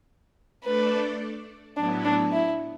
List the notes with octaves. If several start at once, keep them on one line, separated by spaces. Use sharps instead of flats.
A3 D4 A4 B4 D5
A2 F#3 B3 D4 E4
D4
E4